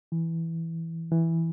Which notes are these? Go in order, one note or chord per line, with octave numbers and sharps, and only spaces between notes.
E3
E3